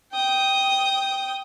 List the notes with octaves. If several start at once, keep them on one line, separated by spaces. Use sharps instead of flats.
G5 D#6